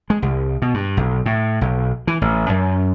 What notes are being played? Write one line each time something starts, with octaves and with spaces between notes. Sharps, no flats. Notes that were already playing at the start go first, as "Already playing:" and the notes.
G#3
C2
B2
G2
B1
A2
B1
E3
A1
F#2